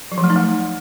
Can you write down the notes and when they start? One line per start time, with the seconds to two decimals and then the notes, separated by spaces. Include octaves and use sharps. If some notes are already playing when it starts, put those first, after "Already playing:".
0.12 F#3
0.18 F3
0.24 A3
0.30 D#4
0.36 A3